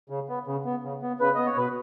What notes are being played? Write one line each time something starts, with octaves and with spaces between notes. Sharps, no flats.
C#3
B3
C#3
B3
C#3
B3
C#3 B4
B3 D#5
C#5
B2 B4